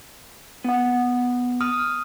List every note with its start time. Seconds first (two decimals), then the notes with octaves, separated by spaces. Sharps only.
0.64 B3 F#5
1.61 D#6 F6